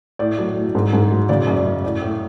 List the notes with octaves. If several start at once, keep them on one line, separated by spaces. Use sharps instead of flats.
A2 D5
F#3
A2
G#2
G#2
F#3
C#3 D5
F#2
D5
F#2
A2 D5
A2